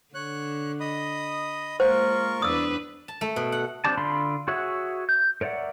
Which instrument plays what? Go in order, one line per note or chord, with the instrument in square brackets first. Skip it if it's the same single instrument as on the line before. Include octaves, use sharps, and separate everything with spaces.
[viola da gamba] D3 [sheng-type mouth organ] C#5 F#6
[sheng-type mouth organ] D#5 B5 D#6
[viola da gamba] G#3 A#3 [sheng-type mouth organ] F4 A#4 C#6 [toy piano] C5
[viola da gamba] E2 D4 B4 [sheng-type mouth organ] D5 [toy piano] D#6 E6
[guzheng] A5
A3
B2
F#5
[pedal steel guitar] C4 D4 G4 D5 A5
D3 D4 F4 B5 C6
F#4 G#4 C#5 E5 F#5
G6
A#4 C#5 D5 E5 F#5